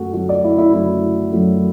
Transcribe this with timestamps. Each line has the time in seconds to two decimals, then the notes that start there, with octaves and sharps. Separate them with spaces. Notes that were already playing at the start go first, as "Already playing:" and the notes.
Already playing: F#2 F#3 A3 F#4 A4
0.13 F#2 F#3 A3 F#4
0.29 D5
0.44 E4
0.58 E4
0.73 F#2 F#3 A3 E4
1.32 F#2 F#3 A3